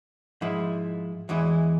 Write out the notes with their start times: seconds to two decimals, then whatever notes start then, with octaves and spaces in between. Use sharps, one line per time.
0.41 G#2 F3 G#3 E4
1.29 E2 E3 G#3 E4